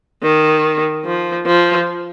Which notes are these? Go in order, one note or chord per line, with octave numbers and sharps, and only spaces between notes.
D#3
F3
F3